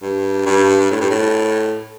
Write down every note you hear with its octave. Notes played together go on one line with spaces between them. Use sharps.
G2
G2
A2
G2
A2